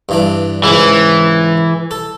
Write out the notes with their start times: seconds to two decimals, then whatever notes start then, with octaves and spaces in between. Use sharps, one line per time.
0.09 G2 E3 D4
0.64 C#2 G#2 E3
1.91 A4